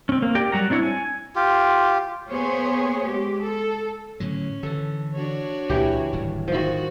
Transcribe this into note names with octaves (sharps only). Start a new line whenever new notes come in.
C4 C#4
A#3
G4 A#4 D5 G5
F#3 G3 F#4 A#5
C4 D4 E4 C#5
G#5
F4 G4
A#3 B3 G#4 C5 C#5
G#3 G4
A4
A2 D3 F#3 C#4
D3 E3 A4
D4 F#4 C#5
C#2 A#2 E3 G4
D1 G#1 G3
D#3 F3 F#4